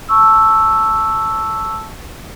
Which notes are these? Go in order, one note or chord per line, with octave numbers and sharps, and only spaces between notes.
A5 C#6 E6